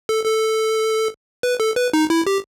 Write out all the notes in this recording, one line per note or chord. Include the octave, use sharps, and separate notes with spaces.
A4
A4
B4
A4
B4
D#4
E4
G4